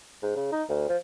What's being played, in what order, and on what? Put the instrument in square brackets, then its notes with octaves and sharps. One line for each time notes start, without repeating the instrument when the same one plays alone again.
[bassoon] G#2
C#3
D#4
D2
F3